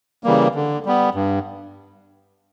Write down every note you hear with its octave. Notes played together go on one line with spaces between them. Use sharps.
C#3 E3 G3 A#3
D3
G3 B3
G2